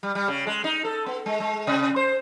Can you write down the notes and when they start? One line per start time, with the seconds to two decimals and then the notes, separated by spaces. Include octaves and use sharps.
0.03 G3
0.15 G3
0.28 C#3
0.47 G#3
0.64 D#4
0.85 A4
1.06 B3
1.26 G#3
1.40 G#3
1.67 C3
1.96 C5